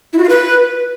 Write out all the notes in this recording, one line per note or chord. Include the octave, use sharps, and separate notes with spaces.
E4
F#4
F4
B4